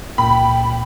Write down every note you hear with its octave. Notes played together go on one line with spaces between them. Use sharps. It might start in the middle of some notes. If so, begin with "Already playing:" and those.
C#2 A#2 A#3 G5 B5